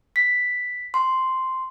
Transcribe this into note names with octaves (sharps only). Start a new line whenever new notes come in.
B6
C6